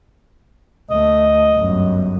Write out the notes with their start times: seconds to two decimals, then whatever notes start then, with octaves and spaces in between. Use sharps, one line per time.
0.90 D2 A3 D#5
1.55 G1 F#2